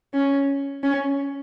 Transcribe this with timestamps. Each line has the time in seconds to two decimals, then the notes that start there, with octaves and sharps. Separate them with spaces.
0.14 C#4
0.83 C#4